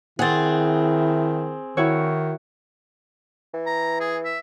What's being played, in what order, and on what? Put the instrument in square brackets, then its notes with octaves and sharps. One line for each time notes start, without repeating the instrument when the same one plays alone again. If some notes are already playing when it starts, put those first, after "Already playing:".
[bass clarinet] D#3 [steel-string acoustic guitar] C4 G#4 [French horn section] E4 [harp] F#5 A6
[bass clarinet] D#3 [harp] E4 F#4 C#5
[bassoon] E3
[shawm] A#5
G#4
E5